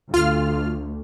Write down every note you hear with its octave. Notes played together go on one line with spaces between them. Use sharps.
D2 F4 F6